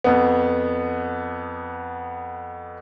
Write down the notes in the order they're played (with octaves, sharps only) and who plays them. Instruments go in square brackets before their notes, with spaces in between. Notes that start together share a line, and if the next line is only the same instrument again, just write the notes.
[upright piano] F2 B3